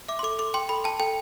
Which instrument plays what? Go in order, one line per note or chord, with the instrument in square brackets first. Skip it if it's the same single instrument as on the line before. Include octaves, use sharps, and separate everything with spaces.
[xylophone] E5 D6
C6
A4 D6
A4 D6
G5 C6
A4 B5
G5 A5
A4 G5